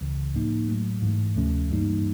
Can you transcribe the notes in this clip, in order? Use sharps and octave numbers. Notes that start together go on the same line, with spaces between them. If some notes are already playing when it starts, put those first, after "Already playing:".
C#2 C#3 E3
A2 F3 A#3 D#4
A2 F#3 A3
G#2 E3 A3
D2 C3 F3 A3 C#4
G2 E3 G3 A#3 D#4